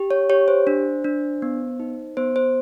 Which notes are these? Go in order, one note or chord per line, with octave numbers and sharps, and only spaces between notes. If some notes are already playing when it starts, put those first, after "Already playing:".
Already playing: G4
C#5
G4 C#5
C5
D4
D4
B3
D#4
B3 C5
C5